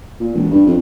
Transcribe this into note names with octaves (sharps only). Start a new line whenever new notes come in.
A#2
E1
G2
F2